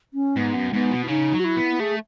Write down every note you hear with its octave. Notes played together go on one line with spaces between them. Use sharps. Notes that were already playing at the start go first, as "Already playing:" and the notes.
C#4
G#2 B3
F#2
G#2 B3
B2
E4
C#3 D#4
F#3
F#4
E4
B3
A3 G#4